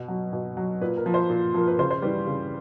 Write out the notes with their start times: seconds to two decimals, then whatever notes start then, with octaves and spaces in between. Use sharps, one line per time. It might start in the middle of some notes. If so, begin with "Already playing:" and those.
Already playing: B2
0.08 F#3
0.33 B2
0.57 F#3
0.81 A#2 B4
0.97 A#4
1.06 F3
1.14 C5
1.30 A#2
1.54 F3 A#4
1.67 B4
1.79 C#3 C5
1.91 C5
2.02 E3 G3 B4
2.27 C#3